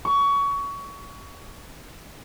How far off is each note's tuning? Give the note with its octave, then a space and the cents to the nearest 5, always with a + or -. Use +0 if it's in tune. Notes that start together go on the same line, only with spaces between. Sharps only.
C#6 +25